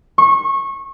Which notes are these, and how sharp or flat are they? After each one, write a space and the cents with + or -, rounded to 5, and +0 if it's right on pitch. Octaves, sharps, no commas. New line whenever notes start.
C#6 -25